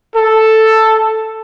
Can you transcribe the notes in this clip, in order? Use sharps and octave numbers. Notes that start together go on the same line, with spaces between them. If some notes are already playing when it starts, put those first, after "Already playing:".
A4